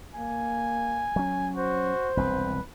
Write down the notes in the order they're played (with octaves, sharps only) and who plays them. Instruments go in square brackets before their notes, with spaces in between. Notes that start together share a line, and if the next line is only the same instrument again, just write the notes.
[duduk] A#3 [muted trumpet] G#5
[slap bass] F#3 C#4
[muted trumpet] F#4 [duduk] C5
[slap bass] E1 C2 C4 [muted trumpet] B4